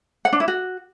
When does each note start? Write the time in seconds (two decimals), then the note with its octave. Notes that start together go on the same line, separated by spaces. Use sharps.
0.25 F#5
0.33 D4
0.40 E4
0.48 F#4